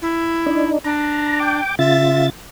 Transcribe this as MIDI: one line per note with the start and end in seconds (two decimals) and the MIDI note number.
0.02 0.70 64
0.46 0.79 62
0.46 0.79 63
0.84 1.60 62
0.84 1.39 82
1.39 1.75 79
1.39 1.75 86
1.79 2.30 49
1.79 2.30 65
1.79 2.26 76
1.79 2.30 93